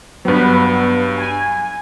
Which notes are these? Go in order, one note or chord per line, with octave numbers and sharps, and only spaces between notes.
G2 F#3 B3 B4
G#5